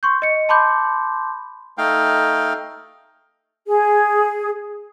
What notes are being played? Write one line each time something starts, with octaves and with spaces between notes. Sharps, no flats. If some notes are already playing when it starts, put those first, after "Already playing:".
C6 C#6 G6
D#5 C#7
A5 B5 C6 D6 G6
A3 D#4 F5 G5
G#4